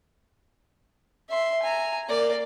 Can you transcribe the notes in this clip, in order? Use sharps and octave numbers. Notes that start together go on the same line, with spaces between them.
E5 C6
G#5 A#5
A#3 D5